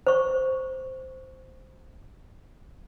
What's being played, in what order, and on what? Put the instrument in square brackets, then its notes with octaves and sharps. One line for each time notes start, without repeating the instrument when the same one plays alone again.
[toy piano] C5 C#6